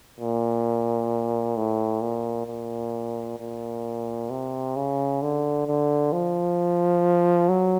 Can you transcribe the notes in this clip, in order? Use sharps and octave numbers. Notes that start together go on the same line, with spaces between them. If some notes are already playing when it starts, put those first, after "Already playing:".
A#2
A2
A#2
A#2
A#2
C3
C#3
D3
D3
F3
F#3